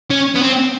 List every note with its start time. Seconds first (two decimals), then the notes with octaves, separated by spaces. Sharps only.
0.10 C#4
0.35 B3
0.42 C4